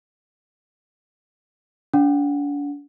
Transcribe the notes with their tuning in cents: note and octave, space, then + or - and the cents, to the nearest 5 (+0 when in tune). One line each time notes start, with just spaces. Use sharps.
D4 -40 F#5 -25